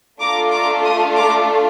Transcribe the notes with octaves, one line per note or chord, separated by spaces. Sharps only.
A3 D4 F4 A4 A#5 D6
A#5 D6
C6 D#6
A#5 D6